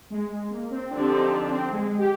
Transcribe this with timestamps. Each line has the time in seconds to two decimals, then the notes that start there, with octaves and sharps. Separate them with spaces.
0.10 G#3
0.30 G#3
0.50 A#3
0.71 C4
0.91 D3 F3 C4 D4 G4
1.11 D#4
1.31 D4
1.51 C4
1.72 G#3
1.98 G4